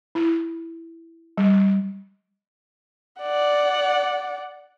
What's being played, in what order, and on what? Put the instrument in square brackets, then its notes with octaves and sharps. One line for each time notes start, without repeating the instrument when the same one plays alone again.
[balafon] E4
G3
[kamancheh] D5 F#5